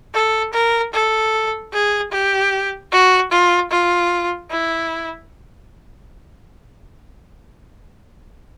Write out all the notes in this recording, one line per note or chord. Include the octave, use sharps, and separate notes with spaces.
A4
A#4
A4
G#4
G4
F#4
F4
F4
E4